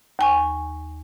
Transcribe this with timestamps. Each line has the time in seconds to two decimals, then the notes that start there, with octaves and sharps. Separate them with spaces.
0.19 D#2 G#5 C#6